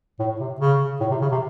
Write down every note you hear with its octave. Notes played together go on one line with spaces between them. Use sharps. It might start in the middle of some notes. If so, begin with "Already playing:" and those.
A2
C3
C#3
A2
C3
C#3
C3